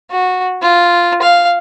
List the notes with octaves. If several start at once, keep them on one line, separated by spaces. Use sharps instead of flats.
F#4
F4
F5